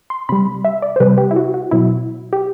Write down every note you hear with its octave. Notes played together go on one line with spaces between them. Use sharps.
C6
C3 G3 B5
E5
D5
C5
C3 G3 B4
G4
E4
F#4
F#4
B2 F#3 E4
G4